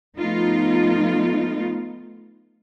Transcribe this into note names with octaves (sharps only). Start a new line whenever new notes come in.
F3 A3 B3 D#4 F4